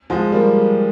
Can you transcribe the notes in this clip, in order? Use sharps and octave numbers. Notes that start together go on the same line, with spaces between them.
F3 G#3
G3 A#3